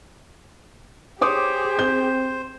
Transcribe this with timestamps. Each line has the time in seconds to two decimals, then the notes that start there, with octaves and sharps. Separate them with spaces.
1.21 G4 G#4 C5 C#5 D6 D#6
1.79 C4 G6